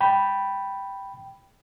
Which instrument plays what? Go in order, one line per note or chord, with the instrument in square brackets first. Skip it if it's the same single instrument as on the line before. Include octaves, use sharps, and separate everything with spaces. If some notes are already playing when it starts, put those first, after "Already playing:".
[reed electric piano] G5 B5